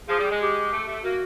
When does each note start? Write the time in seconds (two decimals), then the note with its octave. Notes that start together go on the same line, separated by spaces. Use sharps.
0.09 F3 G#4
0.19 G3
0.30 G#3
0.41 G4
0.72 A3
0.88 A3
1.03 A#3 F#4